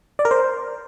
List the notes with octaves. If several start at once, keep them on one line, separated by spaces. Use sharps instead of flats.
D5
A#4
C5